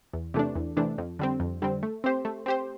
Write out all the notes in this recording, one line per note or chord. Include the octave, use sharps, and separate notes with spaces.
E2
C3 E3 A3 D4
E2
C3 E3 A3 D4
F2
D3 G3 C4
F2
D3 G3 C4
A3
C4 G4 C5
A3
C4 G4 C5